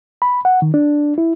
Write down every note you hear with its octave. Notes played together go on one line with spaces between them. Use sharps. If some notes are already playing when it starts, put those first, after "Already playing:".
B5
F#5
D#3
D4
E4